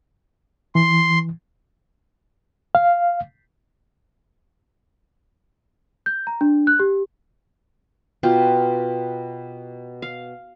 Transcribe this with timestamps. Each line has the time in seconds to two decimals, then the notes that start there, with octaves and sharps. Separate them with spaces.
0.75 E3 C6
2.75 F5
6.06 G6
6.27 A#5
6.41 D4
6.67 F#6
6.80 G4
8.23 B2 F4 G4 A#4
10.02 F5